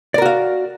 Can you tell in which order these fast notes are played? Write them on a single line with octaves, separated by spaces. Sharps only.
D5 A#4 F#4 F5